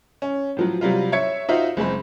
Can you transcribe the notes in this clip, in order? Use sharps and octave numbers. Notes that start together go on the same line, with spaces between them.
C#4
A2 F3 F#3
C3 F#3 G3 F4
C#5 E5 G#6 C#7
D#4 F4 F#4 C5 E5
F#1 G#3 C4 B5